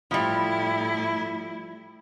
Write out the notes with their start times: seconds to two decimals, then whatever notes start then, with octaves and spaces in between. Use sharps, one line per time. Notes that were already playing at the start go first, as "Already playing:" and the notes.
0.11 A2 F3 G3 E4